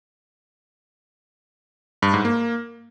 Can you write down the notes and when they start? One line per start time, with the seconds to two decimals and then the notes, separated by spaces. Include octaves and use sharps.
2.02 G2
2.14 G#2
2.25 A#3